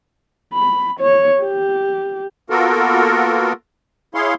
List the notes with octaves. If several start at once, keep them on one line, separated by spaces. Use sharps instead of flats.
B5
C#5
G4
A#3 B3 F4 F#4 A4 A#4
E4 G#4 C#5 F5 C6